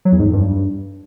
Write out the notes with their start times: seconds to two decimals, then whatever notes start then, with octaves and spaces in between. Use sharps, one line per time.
0.05 F#3
0.12 E2
0.19 G#2
0.26 F2
0.33 G2